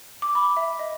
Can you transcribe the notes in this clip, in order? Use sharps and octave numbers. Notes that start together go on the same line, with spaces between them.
D6
B5
E5
D#5